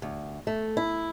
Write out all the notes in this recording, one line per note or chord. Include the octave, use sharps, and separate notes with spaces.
D2
A3
E4